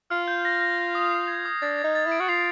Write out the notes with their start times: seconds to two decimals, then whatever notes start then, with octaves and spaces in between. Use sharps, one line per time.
0.10 F4 F6
0.28 G6
0.45 A#6
0.61 A#6
0.78 A#6
0.95 D#6
1.11 C7
1.28 G#6
1.45 D#6
1.62 D4 A6
1.78 A6
1.84 D#4
1.95 A6
2.07 E4 D7
2.20 F#4
2.29 F4 C7